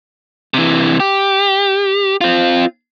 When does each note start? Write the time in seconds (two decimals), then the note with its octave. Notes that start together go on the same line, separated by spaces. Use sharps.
0.54 C3 E3
1.00 G4
2.21 C4 F4